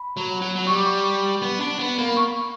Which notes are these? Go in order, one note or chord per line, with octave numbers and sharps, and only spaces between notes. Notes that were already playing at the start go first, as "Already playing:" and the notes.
Already playing: B5
F#3
F#3
F#3
G3 C#6
D6
C#6
B3
D4
B3
A#3
B5
C#6